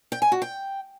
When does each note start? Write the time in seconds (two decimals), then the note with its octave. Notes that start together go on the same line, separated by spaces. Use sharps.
0.12 G5
0.22 G#5
0.32 F#4
0.42 G5